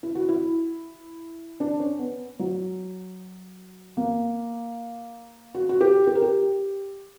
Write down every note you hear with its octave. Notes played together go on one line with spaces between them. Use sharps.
E4
F#4
E4
D4
C#4
B3
F#3
A#3
F#4
F#4
G4
G4
A#4
G4